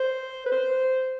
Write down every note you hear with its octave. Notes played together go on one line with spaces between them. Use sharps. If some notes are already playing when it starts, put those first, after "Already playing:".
Already playing: C5
B4
C5